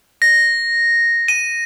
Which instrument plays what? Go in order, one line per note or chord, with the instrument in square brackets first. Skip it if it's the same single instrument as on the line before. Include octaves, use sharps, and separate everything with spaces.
[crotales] A#6
D#7